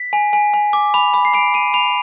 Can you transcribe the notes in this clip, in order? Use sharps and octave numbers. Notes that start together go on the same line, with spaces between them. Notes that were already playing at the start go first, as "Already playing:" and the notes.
Already playing: B6
G#5
G#5
G#5
D6
B5
B5
C7
B5 D7
B5 D#7
B5 F7